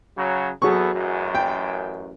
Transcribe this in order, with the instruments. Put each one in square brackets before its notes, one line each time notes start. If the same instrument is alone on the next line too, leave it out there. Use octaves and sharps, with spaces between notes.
[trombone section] C#3 F#3
[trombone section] E2 B3 A4 [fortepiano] F#3 G#4 C#6
[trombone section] A1 F#2
[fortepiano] G5